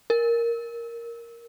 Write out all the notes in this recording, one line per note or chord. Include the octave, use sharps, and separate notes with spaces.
A#4